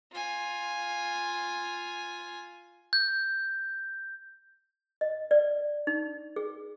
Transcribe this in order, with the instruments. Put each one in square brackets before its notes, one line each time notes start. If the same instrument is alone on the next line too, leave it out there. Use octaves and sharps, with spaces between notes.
[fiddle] F4 G#5
[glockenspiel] G6
[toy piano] D#5
D5
D#4
G#4